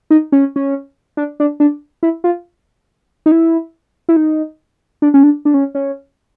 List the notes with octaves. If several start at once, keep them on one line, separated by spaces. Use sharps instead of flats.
D#4
C#4
C#4
D4
D4
D4
E4
F4
D#4
E4
E4
D#4
D4
C#4
D4
D4
C#4
C#4